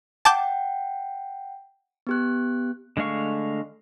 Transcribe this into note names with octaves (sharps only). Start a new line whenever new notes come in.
F#5 G5 A5 D6 G6
B3 G4 F#6
D3 G#3 A3 F5 C#6